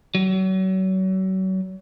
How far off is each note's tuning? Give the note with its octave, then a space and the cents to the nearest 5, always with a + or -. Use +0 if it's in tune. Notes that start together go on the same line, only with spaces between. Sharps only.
F#3 +35